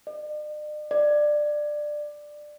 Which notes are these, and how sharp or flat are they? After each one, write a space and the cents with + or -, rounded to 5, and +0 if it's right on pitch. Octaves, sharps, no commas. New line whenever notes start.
D5 +45
D5 +15